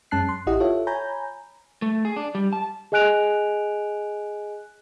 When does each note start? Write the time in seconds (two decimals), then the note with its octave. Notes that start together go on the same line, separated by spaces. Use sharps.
0.11 F#2 G#3 C#4 A5 F#6 C7
0.29 C6
0.47 A1 E4 G4 D#5 F#5
0.60 F4 A4 C#5 E5
0.87 C#5 G#5 A#5 B5 G6
1.82 A3
2.05 G#4
2.17 D4
2.35 G3
2.53 A5
2.92 G#4 D#5 G#5 F#6 D7 F7